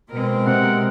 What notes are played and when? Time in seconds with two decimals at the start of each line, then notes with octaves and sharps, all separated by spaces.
0.10 B2 G#3 C4 A#4
0.47 C3 F#5